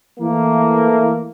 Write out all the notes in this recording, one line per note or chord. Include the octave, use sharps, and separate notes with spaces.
E3 A3 A#3